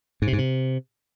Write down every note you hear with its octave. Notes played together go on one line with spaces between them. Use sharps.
G#2
C3
G#2
C3